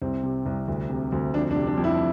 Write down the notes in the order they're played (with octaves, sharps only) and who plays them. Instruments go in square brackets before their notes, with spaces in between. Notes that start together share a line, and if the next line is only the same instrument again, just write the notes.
[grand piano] C2 C4
C3
C2
D2
C3
D2
F2 D4
D4
C3
D4
F2
E4